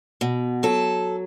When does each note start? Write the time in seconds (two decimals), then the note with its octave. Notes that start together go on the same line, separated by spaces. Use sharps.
0.21 B2
0.63 F#3 A4